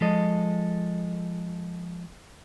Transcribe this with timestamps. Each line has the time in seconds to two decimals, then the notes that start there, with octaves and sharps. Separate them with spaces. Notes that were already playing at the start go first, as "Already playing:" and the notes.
0.01 F3 G#3 A4 D#5